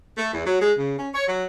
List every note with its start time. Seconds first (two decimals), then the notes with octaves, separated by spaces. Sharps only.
0.17 A3
0.32 E2
0.46 F#3
0.61 G#3
0.78 C#3
0.98 C#4
1.13 C#5
1.27 F#3